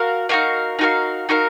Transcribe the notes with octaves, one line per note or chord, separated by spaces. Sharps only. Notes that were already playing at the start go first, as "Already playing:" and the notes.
Already playing: F#4 A#4 F5
D#4 F#4 A#4 F5
D#4 F#4 A#4 F5
D#4 F#4 A#4 F5